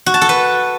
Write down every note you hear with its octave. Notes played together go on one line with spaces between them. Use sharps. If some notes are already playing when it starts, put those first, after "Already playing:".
F#4
A5
A4
B4